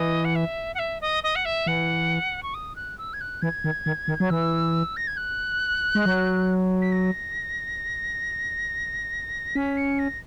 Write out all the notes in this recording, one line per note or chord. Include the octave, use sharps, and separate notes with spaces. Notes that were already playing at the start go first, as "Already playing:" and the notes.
Already playing: E3 D#5
F#5
E5
F#5
E5
D#5
D#5
F#5
E5
E3 F#5
C#6
D#6
F#6
E6
G#6
F#6
E3 G#6
D#3
D#3
D#3
F#3
E3 E6
A#6
G#6
F#6
G#3
F#3
B6
A#6
C#4 B6
C#7
A#6